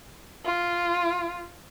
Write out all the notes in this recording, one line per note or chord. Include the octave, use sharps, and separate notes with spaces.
F4